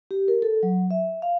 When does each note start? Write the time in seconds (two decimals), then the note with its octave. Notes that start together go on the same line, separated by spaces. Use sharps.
0.11 G4
0.28 A#4
0.42 A4
0.63 F#3
0.91 E5
1.22 F5